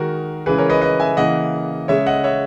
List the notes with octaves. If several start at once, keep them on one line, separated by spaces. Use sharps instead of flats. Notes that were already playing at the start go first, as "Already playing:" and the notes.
Already playing: D#3 G#3 F#4 A#4
C#3 E3 G#3 G#4 B4
A#4 C#5
B4 D#5
B4 D#5
E5 G#5
C#3 E3 A#3 D#5 F#5
C#3 G#3 C#5 E5
D#5 F#5
C#5 E5